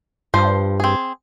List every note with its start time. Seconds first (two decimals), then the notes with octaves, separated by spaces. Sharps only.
0.34 G2 F3 C5
0.80 C4 G#4